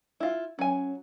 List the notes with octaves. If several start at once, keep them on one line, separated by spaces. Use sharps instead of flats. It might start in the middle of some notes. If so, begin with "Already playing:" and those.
E4 F4
F#3 C#4 G#5